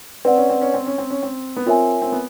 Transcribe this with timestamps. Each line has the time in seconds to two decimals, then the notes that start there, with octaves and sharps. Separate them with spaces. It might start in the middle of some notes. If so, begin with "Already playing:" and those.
0.25 C4 B4 D5 F#5
0.37 C#4
0.50 C4
0.62 C#4
0.74 C4
0.86 C#4
0.98 C4
1.10 C#4
1.23 C4
1.56 B3
1.66 C4 F4 A#4 C#5 E5 G#5
2.02 C4
2.12 B3